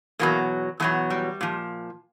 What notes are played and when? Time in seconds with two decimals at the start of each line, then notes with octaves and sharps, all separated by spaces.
0.19 E2 B2 F#3 A#3
0.80 E2 B2 F#3 A3
1.10 G3
1.41 A#2 F3